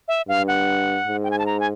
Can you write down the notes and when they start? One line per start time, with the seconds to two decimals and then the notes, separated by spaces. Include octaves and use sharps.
0.08 E5
0.28 G2 F5
0.48 F#5
1.07 G#2
1.23 G5
1.31 G#5
1.39 A5
1.46 A#5
1.60 G#5